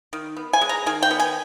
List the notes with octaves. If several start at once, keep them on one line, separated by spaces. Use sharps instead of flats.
D#3
B3
G#5
G#3
A#5
D#3 G#5
G5
B3
G#5